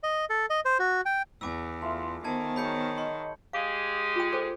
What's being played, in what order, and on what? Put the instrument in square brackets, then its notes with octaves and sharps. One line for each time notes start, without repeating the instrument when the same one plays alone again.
[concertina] D#5
A4
D#5
C5
F#4
G5
[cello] E2 [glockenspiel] G#5 D6 E6
[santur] A3 F4 E5 [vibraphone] C6
[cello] D#3 [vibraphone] B3 C5 [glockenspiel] A5 G#6
[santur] F#3 G#4 C#5 [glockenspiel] B5 G6 C#7
[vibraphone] D#5 [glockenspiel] C6
[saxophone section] G#3 G4 G#4 [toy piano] F5
[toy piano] F4 G5
A4 C5 G5